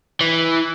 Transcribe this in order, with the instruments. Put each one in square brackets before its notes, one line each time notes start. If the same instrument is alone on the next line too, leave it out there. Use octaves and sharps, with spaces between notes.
[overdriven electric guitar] E3